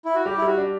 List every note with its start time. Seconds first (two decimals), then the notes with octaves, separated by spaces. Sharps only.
0.05 E4
0.15 F#4
0.25 G3 G4
0.38 E4
0.42 G3 F#4
0.58 D4